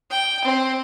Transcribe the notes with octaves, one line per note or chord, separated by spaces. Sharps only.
G5
C4